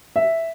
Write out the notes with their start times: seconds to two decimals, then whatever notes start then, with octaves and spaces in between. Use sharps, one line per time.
0.16 E5